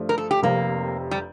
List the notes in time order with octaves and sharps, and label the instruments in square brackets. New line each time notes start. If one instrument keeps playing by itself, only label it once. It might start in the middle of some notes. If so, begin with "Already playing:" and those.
Already playing: [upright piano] G2 F3 A3 D4
[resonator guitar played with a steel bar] A#4
A4
G4
[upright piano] F1 F2 C3 [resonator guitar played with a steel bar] A#3
[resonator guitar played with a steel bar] G3